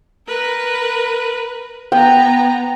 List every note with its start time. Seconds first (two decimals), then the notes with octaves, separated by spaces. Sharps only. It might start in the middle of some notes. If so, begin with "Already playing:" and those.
0.27 A#4 B4
1.92 B3 G5 A#5